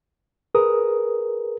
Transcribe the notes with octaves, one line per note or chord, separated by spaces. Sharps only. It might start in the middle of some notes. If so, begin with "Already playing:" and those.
G#4 A#4 B4 D#6